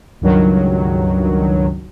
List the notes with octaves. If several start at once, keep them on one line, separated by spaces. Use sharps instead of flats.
C#2 G2 D#3 F#3